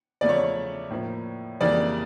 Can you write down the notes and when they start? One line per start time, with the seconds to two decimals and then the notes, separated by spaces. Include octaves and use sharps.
0.21 E2 C#3 F3 A3 D5
0.29 C#5
0.43 C#5
0.90 A2 F3 A#3
1.60 F2 C#3 E3 G3 A#3 D5